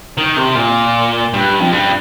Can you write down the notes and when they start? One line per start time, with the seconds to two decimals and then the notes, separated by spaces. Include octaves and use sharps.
0.18 D#3
0.37 C3
0.55 A#2
1.33 G2
1.60 F2
1.72 G2